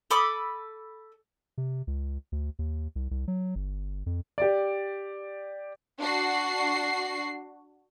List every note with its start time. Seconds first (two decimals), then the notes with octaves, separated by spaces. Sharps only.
0.11 A4 B5 D6 D#6
1.58 C3
1.87 C#2
2.32 D2
2.59 D#2
2.96 C2
3.11 C2
3.28 F#3
3.55 G1
4.06 F2
4.38 G4 D5
5.99 D4 F#4 C7